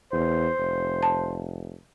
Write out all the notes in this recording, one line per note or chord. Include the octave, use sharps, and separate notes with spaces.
E2 C5
F1
A5